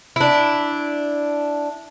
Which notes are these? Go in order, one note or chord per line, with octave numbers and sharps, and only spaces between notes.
D4 E4